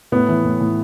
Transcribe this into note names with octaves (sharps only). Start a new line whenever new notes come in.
A2 B3
E3
A2
A2